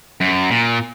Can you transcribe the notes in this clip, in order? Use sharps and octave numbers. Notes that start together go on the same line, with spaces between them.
F#2
A#2